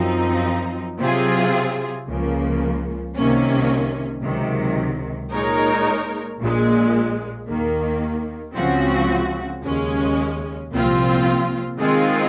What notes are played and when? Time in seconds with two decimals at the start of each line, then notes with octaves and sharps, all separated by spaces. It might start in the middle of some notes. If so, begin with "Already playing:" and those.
Already playing: F#2 F3 C4 D#4
0.99 C3 F#3 C4 F4 G#4
2.07 C#2 C#3 F3 A#3
3.15 C2 C3 D#3 A#3 C#4
4.23 C#2 C3 D#3 F#3
5.31 A#2 G#3 D#4 A#4 C#5
6.39 A#1 A#2 G#3
7.47 D#2 D#3 A#3
8.55 C#2 C#3 F3 C4 F#4
9.63 D#2 C#3 G#3 C#4
10.72 C2 A#2 F3 C4 F4
11.79 D#3 G#3 C4 F4 G#4